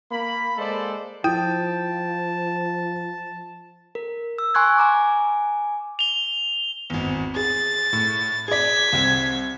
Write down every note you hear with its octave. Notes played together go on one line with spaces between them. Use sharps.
A#3 B5
G#3 A#3 A4 C5 D5
F3 E4 F4 G5 A5
A#4
E6
G#5 C6 C#6 F#6 G#6
G#5 A#5 D6
F7 G7
G#1 E2
G#4 A6
A2
G#4 D5 G#6 B6
C2 C4